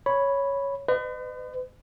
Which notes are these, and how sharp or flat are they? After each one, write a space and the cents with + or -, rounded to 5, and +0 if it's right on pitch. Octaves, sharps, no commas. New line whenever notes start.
C#5 +0 B5 -5
B4 +40 D#5 -35